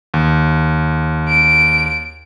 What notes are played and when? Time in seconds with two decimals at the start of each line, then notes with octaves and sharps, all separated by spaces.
0.14 D#2
1.28 D7